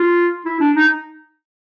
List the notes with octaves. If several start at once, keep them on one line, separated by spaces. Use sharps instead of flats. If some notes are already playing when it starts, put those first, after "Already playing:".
Already playing: F4
E4
D4
D#4